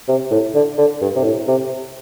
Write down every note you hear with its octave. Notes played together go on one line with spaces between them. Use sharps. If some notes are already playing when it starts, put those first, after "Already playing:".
C3
A2
D3
D3
G2
C3
A2
C3